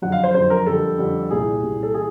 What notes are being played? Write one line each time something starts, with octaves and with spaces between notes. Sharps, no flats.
F2 D3 F#3 F#5
F5
C5
F2 D3 F#3 C5
A#4
F2 D3 G3 A4
F2 D3 G3
C2 A#2 G3 G#4
C2 A#2 G3
A4
E3 G#4